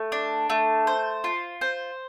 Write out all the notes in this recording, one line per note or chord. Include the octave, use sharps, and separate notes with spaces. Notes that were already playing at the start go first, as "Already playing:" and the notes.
Already playing: A3
D4
A3
C5
F4
C5